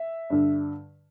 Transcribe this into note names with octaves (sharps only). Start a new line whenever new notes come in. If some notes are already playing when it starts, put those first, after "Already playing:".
Already playing: E5
G2 D3